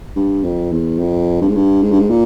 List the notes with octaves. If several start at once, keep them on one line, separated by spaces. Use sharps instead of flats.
G2
F2
E2
F2
G2
G#2
G2
G#2
G2
G#2
A#2